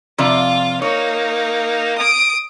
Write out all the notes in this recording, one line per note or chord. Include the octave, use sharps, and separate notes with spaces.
F2 C3 F4 D5 F5
A#3 D#4 C#5
D#6 D7